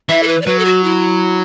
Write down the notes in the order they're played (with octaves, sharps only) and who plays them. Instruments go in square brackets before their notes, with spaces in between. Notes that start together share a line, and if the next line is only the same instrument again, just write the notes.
[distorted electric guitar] E3 [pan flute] E5
[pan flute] A4
B4
D5
[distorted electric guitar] F#3 [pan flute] B4
[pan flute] A4
F#4
E4